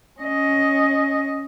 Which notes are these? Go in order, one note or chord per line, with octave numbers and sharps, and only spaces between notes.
C#4 D#5